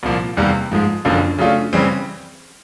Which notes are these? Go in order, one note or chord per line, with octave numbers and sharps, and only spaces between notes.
C2 A#2 F3 A#3
E2 C3 D#3 G3 A#3
G#2 F3 G#3
F#1 F#2 D3 F3 A#3
C#3 F#3 A3 D4 F4
C#3 E3 G3 C4